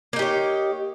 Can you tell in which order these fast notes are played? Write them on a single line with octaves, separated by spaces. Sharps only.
A#3 D#4 G4 C#5